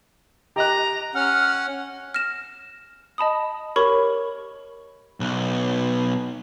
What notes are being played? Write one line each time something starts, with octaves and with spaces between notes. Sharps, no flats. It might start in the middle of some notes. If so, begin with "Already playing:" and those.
G4 D#5 A#5 F#6
C#4 F#5 F6
F6 A#6 E7
D#5 A5 B5 D#6
G4 A#4 C#5 B5 C#6
B1